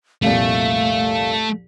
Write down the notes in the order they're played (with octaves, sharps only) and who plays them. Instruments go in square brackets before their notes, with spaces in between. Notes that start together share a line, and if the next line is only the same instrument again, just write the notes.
[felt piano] C2 F2 A#2 [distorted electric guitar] A3 [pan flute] F5